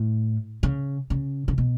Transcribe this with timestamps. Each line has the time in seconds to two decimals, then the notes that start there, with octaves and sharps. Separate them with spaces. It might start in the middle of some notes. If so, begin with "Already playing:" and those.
Already playing: A2
0.63 C#3
1.10 C#3
1.48 C#3
1.58 B2